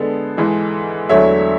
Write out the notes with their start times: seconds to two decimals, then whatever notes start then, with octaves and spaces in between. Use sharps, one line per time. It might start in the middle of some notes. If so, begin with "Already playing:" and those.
Already playing: D3 G#3 B3 A4
0.37 G#2 E3 G#3
1.09 E2 D3 F#3 A3 C#5 E5